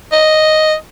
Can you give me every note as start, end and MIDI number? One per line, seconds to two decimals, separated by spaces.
0.12 0.75 75